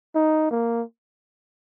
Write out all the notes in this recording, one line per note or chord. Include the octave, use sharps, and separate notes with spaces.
D#4
A#3